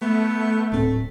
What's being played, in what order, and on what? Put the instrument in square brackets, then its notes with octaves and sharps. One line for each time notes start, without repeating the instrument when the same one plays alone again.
[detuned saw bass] A3 [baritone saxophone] B3
[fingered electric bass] D1 A2 C4 [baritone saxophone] A3